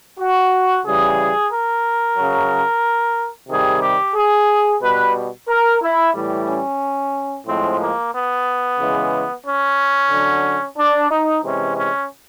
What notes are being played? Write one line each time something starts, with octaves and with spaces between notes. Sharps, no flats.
F#4
C#3 E3 G3 G#4
A#4
C#3 F#3
C3 D#3 G3 G#4
G4
G#4
B2 G3 B4
A#4
E4
A2 E3 G3
C#4
A2 F3 G#3 C4
A#3
B3
C#3 E3 G#3
C#4
D3 F#3
D4
D#4
C3 E3 G#3 C#4
C#4